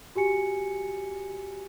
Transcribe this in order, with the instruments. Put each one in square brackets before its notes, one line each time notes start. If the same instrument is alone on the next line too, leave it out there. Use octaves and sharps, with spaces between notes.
[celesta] F#4 G4 G#5 C#7